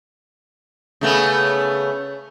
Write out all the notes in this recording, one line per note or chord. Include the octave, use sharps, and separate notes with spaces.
C#3 A3 B3